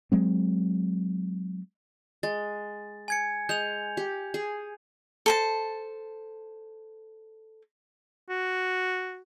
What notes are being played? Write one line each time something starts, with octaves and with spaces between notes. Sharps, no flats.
F#3 G#3 C4
G#3 A6
G#5 G#6 C#7
G#3 G6 F7
G4
G#4
A4 C5 A5
F#4